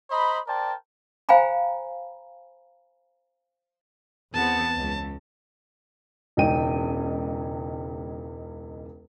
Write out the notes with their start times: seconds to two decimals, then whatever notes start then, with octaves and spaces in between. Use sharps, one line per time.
0.11 C5 D#5 A#5 B5
0.47 A#4 C5 D5 G5 A5
1.29 C5 F5 G5 G#5 A#5 B5
4.34 E2 B3 C4 A5
4.78 C#2
6.37 E1 C#2 C#4 D#4 G5 D#7